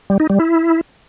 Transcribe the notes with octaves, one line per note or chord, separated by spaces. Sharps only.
G3
D#4
G3
E4